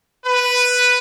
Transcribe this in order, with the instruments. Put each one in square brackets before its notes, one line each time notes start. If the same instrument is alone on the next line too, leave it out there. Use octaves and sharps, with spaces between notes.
[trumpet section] B4